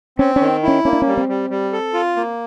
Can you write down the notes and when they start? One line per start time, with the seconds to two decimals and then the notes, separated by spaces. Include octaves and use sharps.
0.18 C4 C#4
0.36 D#3 C#4
0.63 C#4 E4
0.85 A#3 C#4
0.93 D4
1.02 G3 C#4
1.17 C4
1.29 G3
1.50 G3
1.73 A4
1.94 F4
2.16 A#3